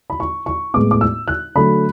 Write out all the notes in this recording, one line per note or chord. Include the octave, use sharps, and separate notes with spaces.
B5
C#6
C#6
A2 G#3 B3 D6
D6
E6
F#6
D3 F#3 A3 B5